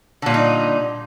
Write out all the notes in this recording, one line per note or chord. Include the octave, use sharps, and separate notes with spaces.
A#2 D3 G3 D#4